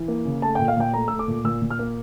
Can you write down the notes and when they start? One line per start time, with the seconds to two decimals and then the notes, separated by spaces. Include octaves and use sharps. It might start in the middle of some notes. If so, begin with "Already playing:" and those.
Already playing: E3
0.08 A#3
0.25 C#3
0.42 A3 A5
0.55 A#2 G5
0.68 F5
0.77 A#2 G5
0.93 A3 A#5
1.08 A3 E6
1.19 D6
1.28 A#2
1.44 A#2 E6
1.62 A#2
1.70 F6
1.79 A#3